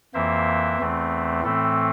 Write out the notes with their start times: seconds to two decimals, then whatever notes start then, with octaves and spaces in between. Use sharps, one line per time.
0.14 F2 E3 A#3 C5 E5
0.79 E2 E3 A3 C4
1.43 A2 E3 A3 C4 A4